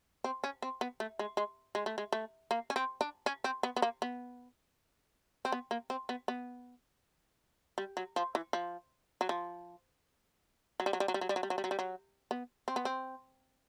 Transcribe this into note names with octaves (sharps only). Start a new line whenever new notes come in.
C4
C#4
C4
B3
A3
G#3
G#3
G#3
A3
G#3
A3
A#3
C#4
C4
D4
C#4
C4
B3
B3
A#3
B3
C4
B3
A#3
C4
B3
B3
G3
F#3
F3
E3
F3
F#3
F3
F#3
G3
F#3
G3
F#3
G3
F#3
G3
F#3
G3
F#3
G3
F#3
G3
F#3
B3
C4
B3
C4